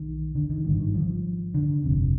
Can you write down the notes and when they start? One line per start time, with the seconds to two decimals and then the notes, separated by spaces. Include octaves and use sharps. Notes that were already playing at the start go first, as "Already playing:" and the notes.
Already playing: B1 D#3
0.35 D3
0.50 D#3
0.64 G#1 G2 D3 D#3
0.80 D#3
0.94 F3
1.54 D3
1.84 G1 F2 C3